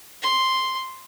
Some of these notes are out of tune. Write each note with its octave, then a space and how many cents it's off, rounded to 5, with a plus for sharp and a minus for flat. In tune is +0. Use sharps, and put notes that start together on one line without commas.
C6 +0